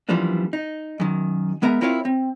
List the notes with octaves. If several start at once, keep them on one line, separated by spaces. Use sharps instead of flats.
F#2 E3 F3 G3 A#3 D4
D#4
F#2 D#3
G#3 B3 A#4 E5 A#5
C4 E4 F4 A#4 C#5 F5
C4